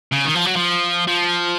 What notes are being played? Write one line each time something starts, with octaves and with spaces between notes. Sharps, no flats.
C#3
D#3
F3
F#3
F3
F3